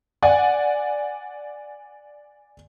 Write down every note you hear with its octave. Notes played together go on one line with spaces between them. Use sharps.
D5 F#5 G#5